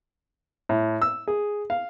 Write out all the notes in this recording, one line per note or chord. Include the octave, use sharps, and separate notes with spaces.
A2
E6
G#4
F5